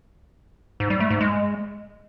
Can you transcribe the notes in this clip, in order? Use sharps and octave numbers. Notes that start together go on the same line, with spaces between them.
G#2
G3
A3
G#2
G#3